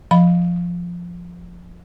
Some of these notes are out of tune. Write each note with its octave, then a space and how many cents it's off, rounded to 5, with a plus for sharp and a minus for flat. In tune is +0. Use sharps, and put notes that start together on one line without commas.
F3 +0 D#5 -5 B5 +0